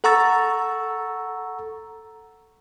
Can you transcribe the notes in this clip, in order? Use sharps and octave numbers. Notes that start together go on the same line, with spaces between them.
A4 F#5 A#5 C#6 E6 A6